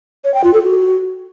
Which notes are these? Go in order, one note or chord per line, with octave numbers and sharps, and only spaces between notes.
C#5
G5
F4
A4
F#4